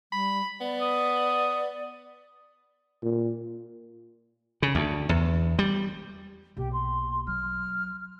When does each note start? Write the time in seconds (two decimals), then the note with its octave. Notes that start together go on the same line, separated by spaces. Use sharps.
0.12 G3 B5
0.61 B3 D5
0.82 D#6
3.03 A#2
4.62 C#3
4.75 D2
5.09 E2
5.59 G3
6.57 B1 A#3 G4
6.73 C6
7.27 F#3 F6